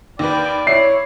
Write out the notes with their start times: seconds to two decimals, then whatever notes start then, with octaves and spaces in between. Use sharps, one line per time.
0.19 D#2 B4 D5 G5
0.67 E4 C#5 C7